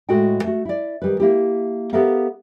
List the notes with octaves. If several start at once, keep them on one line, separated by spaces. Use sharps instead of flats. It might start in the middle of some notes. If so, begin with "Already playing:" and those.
A2 G#3 F#4 A4 D#5 G5
A3 F#4
E4 D5
D#3 G3 B4
A#3 E4 G4
B3 G4 A4 A#4 E5 F5